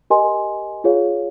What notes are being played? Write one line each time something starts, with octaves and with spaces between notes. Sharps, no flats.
G4 A#4 D#5 G#5 C6
F4 G#4 C#5 F5